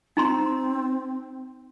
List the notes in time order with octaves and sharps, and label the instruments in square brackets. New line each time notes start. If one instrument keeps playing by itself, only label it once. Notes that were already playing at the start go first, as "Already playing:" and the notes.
[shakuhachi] C4 [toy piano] D#4 A#5 C6